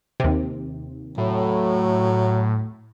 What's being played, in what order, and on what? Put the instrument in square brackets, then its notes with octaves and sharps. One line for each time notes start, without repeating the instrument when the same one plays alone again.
[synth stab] D#2 C3
[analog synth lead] A2 [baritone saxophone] F#3